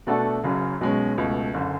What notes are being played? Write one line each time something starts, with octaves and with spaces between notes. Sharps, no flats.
B2 A3 D4 F#4 A4
F#1 F#2 C#3 F#3
B1 B2 G#3 C#4
C#2 B2 A3
F#1 F#2 D3